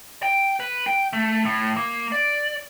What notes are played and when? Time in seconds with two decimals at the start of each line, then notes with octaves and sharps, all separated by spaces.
0.23 G5
0.60 B4
0.86 G5
1.13 A3
1.46 A2
1.77 A#3
2.12 D5